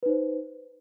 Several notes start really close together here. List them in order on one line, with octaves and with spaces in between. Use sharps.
B4 D#4 C5